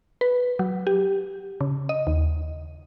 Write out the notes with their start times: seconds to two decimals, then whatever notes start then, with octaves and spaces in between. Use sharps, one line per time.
0.21 B4
0.59 F#3
0.87 G4
1.61 C#3
1.89 D#5
2.07 D#2